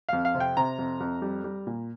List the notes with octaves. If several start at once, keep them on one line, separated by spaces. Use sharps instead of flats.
F2 F5
F5
C3
G5
C3 A#5
F2
F2
G3
G3
A#2